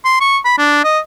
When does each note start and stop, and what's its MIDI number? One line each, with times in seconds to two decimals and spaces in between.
0.05 0.16 84
0.20 0.38 85
0.45 0.54 83
0.58 0.84 62
0.84 0.99 75